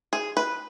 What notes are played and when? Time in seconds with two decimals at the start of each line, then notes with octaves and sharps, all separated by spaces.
0.13 G#4
0.37 B4